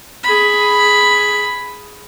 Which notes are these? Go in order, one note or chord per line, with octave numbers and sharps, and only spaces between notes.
G#4 B5